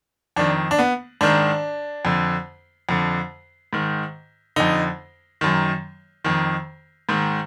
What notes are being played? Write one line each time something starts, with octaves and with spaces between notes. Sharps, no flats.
F2 D#3 D4
D4
B3
G#2 D#3 D4
F2 D3
F2 D3
G#2 D#3
F2 D3 D#4
F#2 D#3
F2 D#3
G#2 D#3